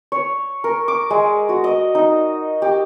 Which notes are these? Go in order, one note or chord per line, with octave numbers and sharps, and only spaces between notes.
C#5
A#4
D6
G#3
F#4
D#5
D#4
G4